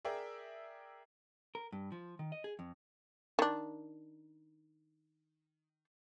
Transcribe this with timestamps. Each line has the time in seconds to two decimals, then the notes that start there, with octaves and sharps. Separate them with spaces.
0.05 G#4 A#4 D5 E5 G5
1.55 A#4
1.72 G2
1.92 F3
2.19 D#3
2.32 D#5
2.44 G#4
2.59 F2
3.39 D#3 D4